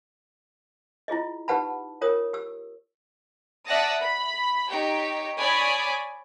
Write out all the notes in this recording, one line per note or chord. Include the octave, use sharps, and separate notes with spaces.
E4 F4 G#4 D#5
D#4 G4 B4 F#5 A5 B5
F4 A#4 C#5 D#6
G4 E6
D5 E5 F#5 A5 D#6 A#6
B5
D#4 G4 C#5 G5
C#5 D5 G#5 B5 D6 D#6